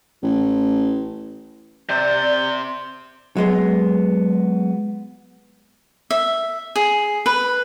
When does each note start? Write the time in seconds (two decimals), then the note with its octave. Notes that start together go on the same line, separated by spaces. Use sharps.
0.23 A1
1.89 C3 C5 D5
3.37 F#3 G#3 B3
6.11 E5
6.76 G#4
7.26 B4